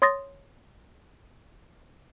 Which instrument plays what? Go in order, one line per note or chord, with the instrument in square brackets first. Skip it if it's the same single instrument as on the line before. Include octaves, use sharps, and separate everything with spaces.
[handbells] C#5 C6 D#6 A6 A#6